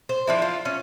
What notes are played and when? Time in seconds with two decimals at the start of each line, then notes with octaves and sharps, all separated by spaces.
0.09 C5
0.27 F3 D4 E4
0.42 F4
0.65 C#4